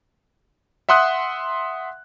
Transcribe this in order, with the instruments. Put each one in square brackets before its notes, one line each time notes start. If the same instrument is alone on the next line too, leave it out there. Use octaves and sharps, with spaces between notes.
[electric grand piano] E5 F#5 C6 D#6 F#6